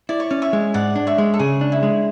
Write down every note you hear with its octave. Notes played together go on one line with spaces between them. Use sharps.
E4 D5
C#5
C#4 D5
C#5 E5
G#3
G#2 D5 F#5
D4
C#5 E5
G#3
A4
C#3 G#4
D4
E4
G#3